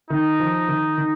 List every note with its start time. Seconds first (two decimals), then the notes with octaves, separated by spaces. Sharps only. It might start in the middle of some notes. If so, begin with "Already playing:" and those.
0.10 D#3 D#4
0.40 F3
0.68 D#3
0.98 D#3